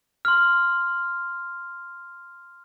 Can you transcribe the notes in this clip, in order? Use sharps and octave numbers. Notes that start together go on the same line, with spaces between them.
C6 F6